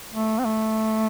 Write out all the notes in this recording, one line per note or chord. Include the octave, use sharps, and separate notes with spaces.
A3
C4
A3